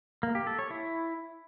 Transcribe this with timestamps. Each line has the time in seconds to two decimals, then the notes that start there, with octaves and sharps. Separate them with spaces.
0.23 A#3
0.35 G4
0.47 A4
0.59 C#5
0.70 E4